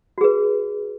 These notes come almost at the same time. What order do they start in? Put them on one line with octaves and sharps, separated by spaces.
F#4 G#4 B4